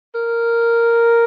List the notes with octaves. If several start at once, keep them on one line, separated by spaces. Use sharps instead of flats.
A#4